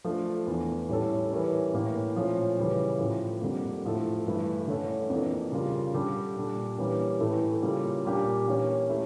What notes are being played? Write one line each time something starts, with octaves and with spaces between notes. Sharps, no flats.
F3 A3 D4 A4
E2 E3 A3
A2 G3 C#4 E4 A4
E3 G3 C#4 E4 A#4
A2 E3 A#3 C#4 E4
A#2 F3 A3 C#4
C#3 E3 G3 C#4
A2 F3 A3
F2 D3 G3 A#3
A2 F3 A3 E4 A4
G2 E3 A3 E4
D3 A3 C#4 E4 A4
F2 E3 A#3 D4
C#3 G3 D4 F4 A#4
D3 G3 D4 A4
A#2 G3 D4
E3 G3 A#3 C#4 G4
A2 E3 A3 E4 A4
C#3 G3 A#3 C#4 F4
A#2 G3 A#3 D4 G4
E3 A#3 C#4 G4
A3 E4 G4